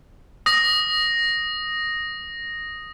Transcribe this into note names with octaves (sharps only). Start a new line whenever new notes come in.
D#6 A#6